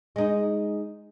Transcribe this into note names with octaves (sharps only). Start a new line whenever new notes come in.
G#3 D#4